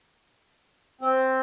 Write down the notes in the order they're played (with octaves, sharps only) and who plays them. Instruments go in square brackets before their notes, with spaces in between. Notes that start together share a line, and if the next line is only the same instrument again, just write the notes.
[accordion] C4